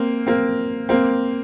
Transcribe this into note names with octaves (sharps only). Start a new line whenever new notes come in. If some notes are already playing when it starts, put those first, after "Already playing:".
Already playing: A#3 C4
A#3 C4
A#3 C4